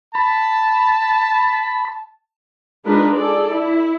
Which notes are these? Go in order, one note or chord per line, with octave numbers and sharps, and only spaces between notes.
A5 B5
G#3 D4 D#4 F4 A#4 B4
G#4 A4 D5
E4